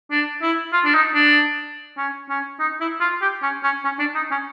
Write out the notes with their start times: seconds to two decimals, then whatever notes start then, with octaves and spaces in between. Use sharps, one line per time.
0.11 D4
0.42 E4
0.73 F4
0.85 D4
0.94 D#4
1.14 D4
1.97 C#4
2.29 C#4
2.60 D#4
2.80 E4
3.01 F4
3.22 G4
3.42 C#4
3.63 C#4
3.84 C#4
3.99 D4
4.15 D#4
4.31 C#4